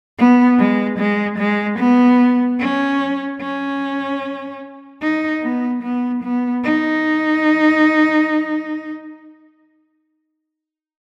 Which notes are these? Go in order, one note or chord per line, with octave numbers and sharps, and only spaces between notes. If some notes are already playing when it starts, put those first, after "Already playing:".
B3
G#3
G#3
G#3
B3
C#4
C#4
D#4
B3
B3
B3
D#4